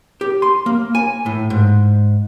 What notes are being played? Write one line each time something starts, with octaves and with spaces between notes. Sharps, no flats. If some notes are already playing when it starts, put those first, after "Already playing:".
G4
C6
A#3
G#5
A2
G#2